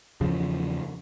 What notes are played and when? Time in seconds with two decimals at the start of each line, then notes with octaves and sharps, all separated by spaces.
0.21 E2 C#3 F3